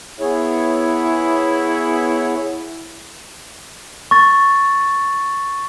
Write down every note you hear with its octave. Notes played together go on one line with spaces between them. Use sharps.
B3 E4 G#4 C#5
C#6 A6